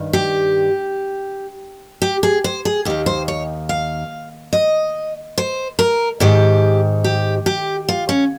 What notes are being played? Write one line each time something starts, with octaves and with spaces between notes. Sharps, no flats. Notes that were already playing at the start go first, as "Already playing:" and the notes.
Already playing: G2 D#3
G4
G4
G#4
C5
G#4
D#2 D#3 G4
C5
C#5
F5
D#5
C5
A#4
G#2 D#3 G4
G4
G4
F4
C#4